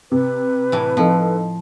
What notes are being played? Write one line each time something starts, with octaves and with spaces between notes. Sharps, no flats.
C3 B4
A2 E3
F3 C4 D#4 A4